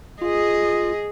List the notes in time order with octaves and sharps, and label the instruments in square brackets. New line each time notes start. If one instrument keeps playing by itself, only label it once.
[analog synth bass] F4 [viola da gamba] G#4 [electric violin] D#5